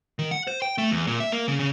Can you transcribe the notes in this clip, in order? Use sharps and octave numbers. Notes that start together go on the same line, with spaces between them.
D#3
F#5
C5
G5
A3
E2
A#2
E5
A#3
C#3
C#3